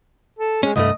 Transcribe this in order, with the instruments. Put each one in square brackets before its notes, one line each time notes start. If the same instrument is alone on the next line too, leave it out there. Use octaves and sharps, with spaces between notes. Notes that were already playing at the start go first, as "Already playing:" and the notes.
[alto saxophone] A4
[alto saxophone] G#3 [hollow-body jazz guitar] C#4
[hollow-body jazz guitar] C2 G2 A3 [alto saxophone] D#5